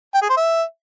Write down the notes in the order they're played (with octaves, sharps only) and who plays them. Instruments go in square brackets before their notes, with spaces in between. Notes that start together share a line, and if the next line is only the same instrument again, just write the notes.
[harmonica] G5
G#4
C5
E5